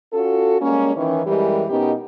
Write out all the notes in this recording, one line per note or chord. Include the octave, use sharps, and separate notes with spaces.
C#4 F4 F#4 A4
G3 G#3 A#3 C#4
D#3 E3 C#4
F#2 E3 G3 G#3 G4 A#4
B2 B3 C#4 D#4 G4 A#4